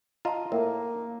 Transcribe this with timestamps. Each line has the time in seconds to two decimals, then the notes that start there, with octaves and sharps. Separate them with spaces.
0.25 F4 D#5 A5 A#5
0.52 A2 A#3 A#4